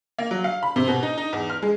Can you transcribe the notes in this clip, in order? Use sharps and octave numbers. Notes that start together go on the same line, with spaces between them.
A#3
F#3
F5
B5
C3
B2
D#4
D#4
E2
F6
G#3